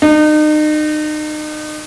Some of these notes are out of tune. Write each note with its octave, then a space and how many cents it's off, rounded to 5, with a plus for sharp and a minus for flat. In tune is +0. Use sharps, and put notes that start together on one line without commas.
D#4 -35